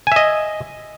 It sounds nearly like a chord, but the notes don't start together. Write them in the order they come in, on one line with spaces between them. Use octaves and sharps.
G#5 E5 D#5